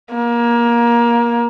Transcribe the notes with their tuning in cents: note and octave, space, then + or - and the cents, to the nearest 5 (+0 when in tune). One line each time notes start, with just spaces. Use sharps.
A#3 +20